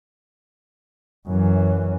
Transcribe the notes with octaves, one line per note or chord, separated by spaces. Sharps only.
F#2 E3